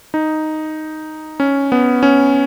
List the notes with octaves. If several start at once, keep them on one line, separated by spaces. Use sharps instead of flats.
D#4
C#4
B3
C#4